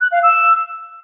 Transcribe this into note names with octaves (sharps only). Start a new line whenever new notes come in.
F#6
F5
E6